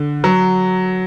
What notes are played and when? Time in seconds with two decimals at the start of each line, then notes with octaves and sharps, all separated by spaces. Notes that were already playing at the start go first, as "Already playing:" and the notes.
Already playing: D3
0.24 F#3